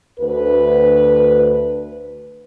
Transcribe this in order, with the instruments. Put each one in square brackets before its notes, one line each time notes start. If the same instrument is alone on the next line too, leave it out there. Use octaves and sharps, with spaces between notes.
[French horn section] D2 B4